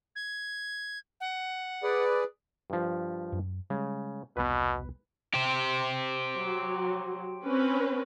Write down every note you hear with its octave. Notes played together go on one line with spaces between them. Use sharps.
G#6
F#5
G#4 B4 D5
G2 F3
F#2
C#3 G3 G#3
E1 C2 B2 B3 B4
G4 C5
F#3
C4 C#4 B4